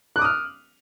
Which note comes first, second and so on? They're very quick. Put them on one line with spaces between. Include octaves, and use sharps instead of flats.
F#6 D6 D#6 F6